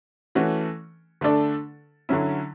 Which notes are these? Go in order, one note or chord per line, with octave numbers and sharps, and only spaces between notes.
E3 A3 C#4 F#4
D3 A3 D4 A4 D5
D3 F#3 C#4 E4